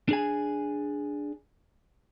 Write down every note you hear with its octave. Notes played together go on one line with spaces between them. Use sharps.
D4 G#4 G#5